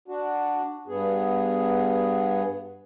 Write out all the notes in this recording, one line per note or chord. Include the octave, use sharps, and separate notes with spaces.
D4 F#4
G2 B3 G#4